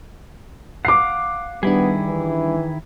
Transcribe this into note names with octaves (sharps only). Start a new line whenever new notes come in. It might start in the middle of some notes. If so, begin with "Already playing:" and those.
F5 F#5 D6 C7
D#3 G3 B3 D4 E4 G#4
E3